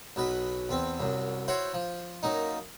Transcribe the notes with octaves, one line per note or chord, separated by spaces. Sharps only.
B1 B2 B4
E2 C4
C2 F#2
E4 F#4 C5 C#5
F3
F#2 A#3 D#4